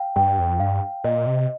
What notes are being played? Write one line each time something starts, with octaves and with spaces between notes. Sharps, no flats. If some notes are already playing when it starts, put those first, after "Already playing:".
Already playing: F5 G5
G2 G5
F2
G2 F5
A#2 D#5
C3